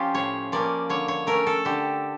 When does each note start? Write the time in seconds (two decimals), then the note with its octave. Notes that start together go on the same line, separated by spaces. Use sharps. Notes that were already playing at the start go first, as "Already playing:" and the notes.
Already playing: F3 C#4 F4 G4
0.14 A2 C#5
0.52 F3 A#3 C#4 D5
0.89 D3 C#5
1.08 C#5
1.27 A3 C#4 A#4
1.47 A4
1.65 D3 G4